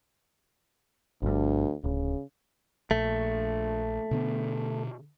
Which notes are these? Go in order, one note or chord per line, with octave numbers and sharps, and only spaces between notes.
G1 D2 G2
D1 C#3
A#1 A3
B2 D3 B3